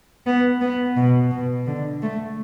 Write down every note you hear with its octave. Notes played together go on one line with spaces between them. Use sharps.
B3
B3
B2
B2
D3
A3